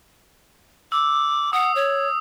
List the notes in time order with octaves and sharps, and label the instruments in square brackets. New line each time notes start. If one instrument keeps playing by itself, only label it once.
[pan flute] D6 [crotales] E6
[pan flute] F#5 [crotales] D#6
[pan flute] C#5